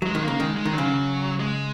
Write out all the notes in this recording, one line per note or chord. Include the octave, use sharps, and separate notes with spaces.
F#3 G#3
D#3
C#3 A#3
D#3 G#3
G#3
D#3
C#3 F#3
G#3